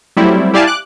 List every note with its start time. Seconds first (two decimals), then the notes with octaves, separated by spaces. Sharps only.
0.17 F#3 G3 A3 C4 E4
0.54 E4 G4 D5 F5 G#5 A5
0.67 D6 F#6